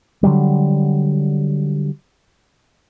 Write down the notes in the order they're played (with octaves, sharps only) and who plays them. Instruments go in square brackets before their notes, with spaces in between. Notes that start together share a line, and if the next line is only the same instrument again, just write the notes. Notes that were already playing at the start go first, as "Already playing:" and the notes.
[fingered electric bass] D3 F#3 G3